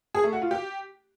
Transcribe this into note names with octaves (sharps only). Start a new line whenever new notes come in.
G#4
A3
F#4
F4
G4